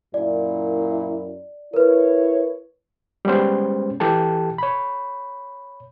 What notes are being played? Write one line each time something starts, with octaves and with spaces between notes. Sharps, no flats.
F#2 A#2 E4 D5
E4 A#4 B4 C#5
G3 G#3 B3 C#4 C5
E3 G4 A4 A5
C#5 B5